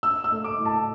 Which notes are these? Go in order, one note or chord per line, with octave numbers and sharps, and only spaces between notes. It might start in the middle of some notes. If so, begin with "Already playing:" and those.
D4 E6
E6
A3
D6
A2
A5